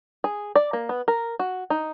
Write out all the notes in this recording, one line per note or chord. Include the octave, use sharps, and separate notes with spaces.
G#4
D5
A#3
B3
A#4
F#4
D#4